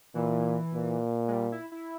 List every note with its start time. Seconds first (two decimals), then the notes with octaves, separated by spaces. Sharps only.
0.15 A#2 E3
0.74 A#2
1.28 G#3
1.33 G3
1.52 E4
1.72 E4